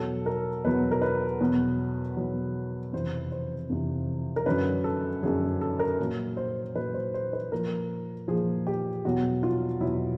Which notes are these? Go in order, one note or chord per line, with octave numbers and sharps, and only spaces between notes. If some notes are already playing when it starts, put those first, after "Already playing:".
Already playing: E2 B2 F#3 A4
A#4
E2 B2 F#3 B4
A#4
B4
E2 B2 F#3
E2 B2 F#3
F2 C3 E3 C5
C5
F2 C3 E3
A#4
F#2 D3 F#3 B4
A4
F#2 D3 F#3 G#4
A4
A#4
A#2 F#3
C5
A#2 F#3 B4
C5
C5
B4
A#2 F3 A#4
A#2 F3 G#4
G4
E2 B2 F#3 F#4
F4
E2 B2 F#3 E4